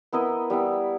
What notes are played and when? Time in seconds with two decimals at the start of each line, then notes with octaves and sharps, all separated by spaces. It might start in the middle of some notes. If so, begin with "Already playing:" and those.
0.12 B3 E4 A#4 D#5
0.50 G3 B3 E4